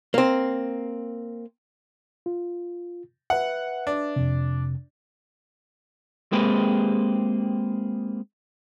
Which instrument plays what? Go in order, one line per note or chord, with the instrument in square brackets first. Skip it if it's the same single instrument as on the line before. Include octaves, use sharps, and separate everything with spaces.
[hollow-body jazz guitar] A#3 C4
[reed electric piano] F4
[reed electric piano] B4 E5 [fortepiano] F#5
[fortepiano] D4
[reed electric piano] F2 C3
[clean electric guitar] G#3 A#3 C4 G4 G#4 B4